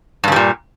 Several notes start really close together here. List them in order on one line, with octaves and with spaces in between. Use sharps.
G2 C#3 G3 A#2